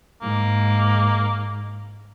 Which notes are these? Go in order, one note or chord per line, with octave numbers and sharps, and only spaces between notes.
G#2 A#3